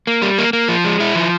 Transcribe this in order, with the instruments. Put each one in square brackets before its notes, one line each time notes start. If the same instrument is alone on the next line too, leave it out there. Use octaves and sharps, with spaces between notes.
[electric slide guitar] A#3
G3
A#3
A#3
F3
G#3
E4
F3